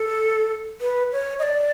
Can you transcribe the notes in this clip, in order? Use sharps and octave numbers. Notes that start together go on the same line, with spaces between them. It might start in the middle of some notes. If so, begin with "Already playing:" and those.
Already playing: A4
B4
C#5
D#5
D5